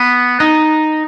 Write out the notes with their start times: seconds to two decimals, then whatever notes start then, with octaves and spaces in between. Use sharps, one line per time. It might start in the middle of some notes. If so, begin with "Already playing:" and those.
Already playing: B3
0.40 D#4